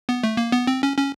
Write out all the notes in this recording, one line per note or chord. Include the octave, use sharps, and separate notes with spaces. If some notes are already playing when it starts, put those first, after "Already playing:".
B3
A3
A#3
B3
C4
C#4
C#4